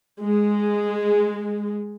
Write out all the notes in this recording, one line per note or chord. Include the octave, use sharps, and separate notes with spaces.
G#3